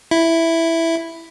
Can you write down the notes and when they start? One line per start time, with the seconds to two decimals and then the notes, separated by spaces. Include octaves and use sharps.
0.11 E4